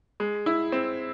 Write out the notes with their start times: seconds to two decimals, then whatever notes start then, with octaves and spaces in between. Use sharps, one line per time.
0.20 G#3
0.46 E4
0.72 C4